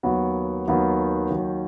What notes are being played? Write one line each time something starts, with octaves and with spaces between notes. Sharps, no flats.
D#2 D#3 F#3 B3
D#2 D#3 F#3 B3
D#2 D#3 F#3